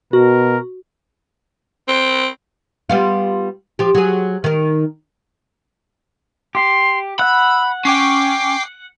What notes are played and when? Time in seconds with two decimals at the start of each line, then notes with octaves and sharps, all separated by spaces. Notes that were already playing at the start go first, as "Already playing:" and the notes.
0.13 B2 F#4 A#4
1.88 C4
2.89 G3 B3 F4
3.79 F3 G4
3.95 F#3 G#4
4.44 D#3 A#4
6.55 G4 C6
7.19 F#5 B5 E6
7.85 C#4 G5 C#6 D6 C7